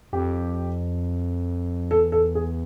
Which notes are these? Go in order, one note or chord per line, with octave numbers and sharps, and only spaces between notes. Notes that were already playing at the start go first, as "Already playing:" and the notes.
F2 G4
E2 A4
A4
G#4